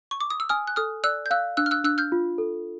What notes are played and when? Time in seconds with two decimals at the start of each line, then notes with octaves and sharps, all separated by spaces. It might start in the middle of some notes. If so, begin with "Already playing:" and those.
0.11 C#6
0.21 D6
0.30 D#6
0.40 E6
0.49 G#5 D#6 F6
0.67 F#6
0.76 A4 D#6 F6
1.04 D5 E6 F#6
1.26 G6
1.31 F5 E6 F#6
1.57 D4 E6 F#6
1.66 F6
1.71 E6 F#6
1.84 D4 E6 F#6
1.98 F6 G6
2.12 F4
2.38 A4